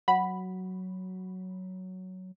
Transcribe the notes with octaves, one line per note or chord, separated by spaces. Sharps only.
F#3 F#5 B5